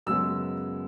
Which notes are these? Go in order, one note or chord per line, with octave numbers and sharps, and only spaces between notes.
F#2 C#3 G#3 B3 E6